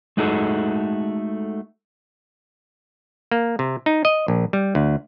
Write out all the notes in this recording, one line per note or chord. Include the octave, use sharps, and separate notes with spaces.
G#3 A3 D#4 F#4 G#4 A4
A#3
C3
D#4
D#5
A#1
G3
D2